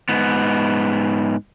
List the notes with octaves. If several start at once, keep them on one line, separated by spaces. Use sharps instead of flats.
G#2 B3